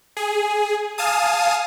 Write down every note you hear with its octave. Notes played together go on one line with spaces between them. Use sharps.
G#4
F5 G#5 A5 D#6